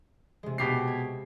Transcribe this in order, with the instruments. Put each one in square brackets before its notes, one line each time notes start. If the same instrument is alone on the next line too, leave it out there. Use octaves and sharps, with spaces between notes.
[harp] C3 G#3
[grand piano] B2 G4 C7
[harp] G#6